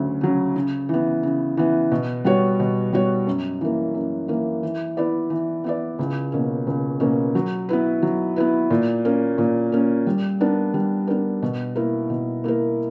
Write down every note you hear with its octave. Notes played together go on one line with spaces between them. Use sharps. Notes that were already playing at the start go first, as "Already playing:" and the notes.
Already playing: D2 C#3 F#3 C#4
C#3 F#3 C#4
C#3
E3 B3
C#3
E3 B3
B2
G3 B3 F#4 C#5
B2
G3 B3 F#4 C#5
F#2
E3 A#3
F#2
E3 A#3
E3
B3 E4 B4 D5
E3
B3 E4 B4 D5
C#2
B2 A#3 C#4
C#2
B2 A#3 C#4
F#3
B3 E4 B4
F#3
B3 E4 B4
A#2
A#3 C#4
A#2
A#3 C#4
G3
B3 D4 A#4
G3
B3 D4 A#4
B2
A#3 E4 A#4
B2
A#3 E4 A#4